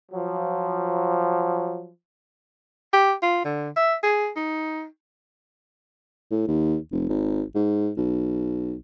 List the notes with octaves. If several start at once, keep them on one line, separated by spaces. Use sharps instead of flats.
F3 F#3
G4
F4
D3
E5
G#4
D#4
A2
D#2
F1
G#1
G#2
B1